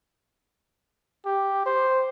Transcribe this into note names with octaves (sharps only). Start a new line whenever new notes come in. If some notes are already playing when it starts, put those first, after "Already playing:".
G4
C5